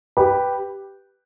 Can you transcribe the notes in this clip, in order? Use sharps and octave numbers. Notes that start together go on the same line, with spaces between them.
G4 B4